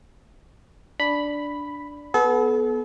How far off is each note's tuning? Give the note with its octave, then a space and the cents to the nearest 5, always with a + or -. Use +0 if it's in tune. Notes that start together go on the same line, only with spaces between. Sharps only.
D4 -5 B5 +0
B3 -5 A4 -40